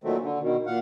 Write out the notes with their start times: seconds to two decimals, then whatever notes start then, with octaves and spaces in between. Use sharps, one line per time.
0.04 A#2 D#3 F#3 A3 C4
0.22 D3
0.41 B2 D#3
0.66 A#2 F5 F#5